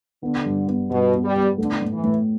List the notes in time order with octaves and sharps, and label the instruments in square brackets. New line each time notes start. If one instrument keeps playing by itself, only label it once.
[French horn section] D3 [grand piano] B3
[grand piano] G2
B3
[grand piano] G2 [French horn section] B2
[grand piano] B3
[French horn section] G3
[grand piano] B3
[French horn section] D3 [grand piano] A3
[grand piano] A2
[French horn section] E3
[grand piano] A2